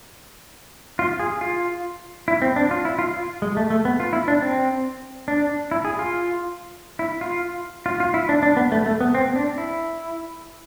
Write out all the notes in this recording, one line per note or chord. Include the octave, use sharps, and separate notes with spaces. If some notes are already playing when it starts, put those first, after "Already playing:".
F4
G#4
F4
E4
C4
D4
F4
E4
F4
F4
G#3
A3
A3
B3
F4
E4
D4
C4
D4
E4
G#4
F4
E4
F4
F4
F4
E4
D4
D4
B3
A3
A3
B3
C4
D4
E4